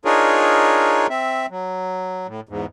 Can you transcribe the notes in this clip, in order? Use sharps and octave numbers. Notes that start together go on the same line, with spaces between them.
D4 D#4 F4 G#4 A#4 C#5
C4 E5
F#3
A2
E2 G#2